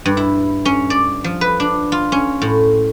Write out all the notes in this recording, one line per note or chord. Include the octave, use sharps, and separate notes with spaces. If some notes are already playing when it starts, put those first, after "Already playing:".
G2
E4
C#4
D5
F3
B4
D4
F4
C#4
A2